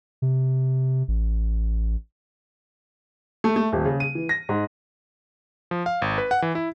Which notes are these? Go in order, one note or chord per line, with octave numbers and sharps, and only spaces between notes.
C3
A1
A3
A3
D#1
C#3
D#7
E3
A#6
G#2
F3
F5
G#1
B4
F#5
E3
E4